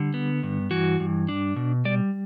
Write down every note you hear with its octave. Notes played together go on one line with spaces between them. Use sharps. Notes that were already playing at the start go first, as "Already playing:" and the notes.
Already playing: D3 G3
B3
G2
E3 F#4
G2
D4
B2
G3 D5